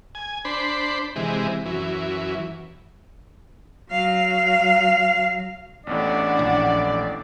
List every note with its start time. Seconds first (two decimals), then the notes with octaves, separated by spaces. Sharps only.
0.15 G#5
0.45 D4 C5 B5
1.16 C3 E3 G#3
1.66 F#2 E3
3.90 F#3 F5
5.87 A1 E2 A2 D4 D5 F#5
6.39 A#1